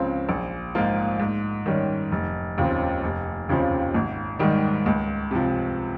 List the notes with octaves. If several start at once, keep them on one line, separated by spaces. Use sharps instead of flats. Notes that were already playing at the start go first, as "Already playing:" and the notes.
Already playing: C#2 C#3 F3 C4
A#1
G#2 F3 A#3 F4
G#2
D#3 G3 C#4
F1
D#2 C#3 F3 C4
F1
D#2 C#3 F3 C4
G#1
G#2 D#3 G3
C#2
C3 F3